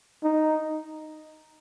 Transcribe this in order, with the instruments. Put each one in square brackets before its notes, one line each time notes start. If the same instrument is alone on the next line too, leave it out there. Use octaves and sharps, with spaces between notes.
[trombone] D#4